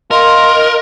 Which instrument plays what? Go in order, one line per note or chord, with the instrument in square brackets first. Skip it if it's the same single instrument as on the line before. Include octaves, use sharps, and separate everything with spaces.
[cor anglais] F4 [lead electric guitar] A#4 [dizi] D#5